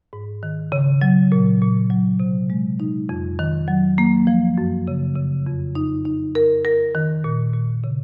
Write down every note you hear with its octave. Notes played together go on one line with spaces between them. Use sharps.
G#2
D#3
C#3
F#3
A#2
A#2
F#3
C3
G#3
D#4
F2
D#3
F#3
A#3
F3
F#2
C#3
C#3
F2
D#4
D#4
A#4
A#4
D#3
A#2
A#2
C#3